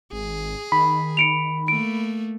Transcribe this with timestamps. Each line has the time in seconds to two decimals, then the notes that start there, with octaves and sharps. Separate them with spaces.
0.13 G#1 G#4
0.72 D#3 B5
1.17 C#7 D7 F7
1.68 A3 A#3 D7